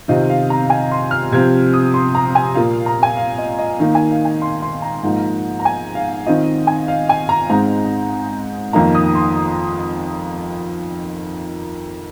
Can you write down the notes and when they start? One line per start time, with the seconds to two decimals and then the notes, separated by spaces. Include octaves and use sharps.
0.08 C3 D#3 C4 F4 D#5
0.30 F5
0.50 A#5
0.70 G#5
0.92 C6
1.11 F6
1.32 C3 F3 C4 G#6
1.73 D#6
1.94 C6
2.15 A#5
2.35 G#5
2.55 A#2 A#3 F4 F5
2.86 A#5
3.03 G#5
3.17 F5
3.38 D#5
3.59 D#5
3.79 D#3 A#3 D#4 F5
3.95 G#5
4.11 F5
4.25 G#5
4.42 C6
4.62 C6
4.82 A#5
5.03 G#2 F3 A#3 D#4
5.60 A#5
5.65 G#5
5.95 F5
6.26 D#3 C4 F4 D#5
6.67 G#5
6.88 F5
7.09 G#5
7.29 A#5
7.50 G#2 G#3 C4 D#4 A#5
8.73 F2 D#3 A#3 D#4 A#5
8.95 D#6
9.15 C6